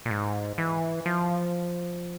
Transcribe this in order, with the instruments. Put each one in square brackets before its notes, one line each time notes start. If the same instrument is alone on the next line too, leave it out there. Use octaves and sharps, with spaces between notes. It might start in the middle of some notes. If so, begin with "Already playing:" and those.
[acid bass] A#2
G#2
E3
F3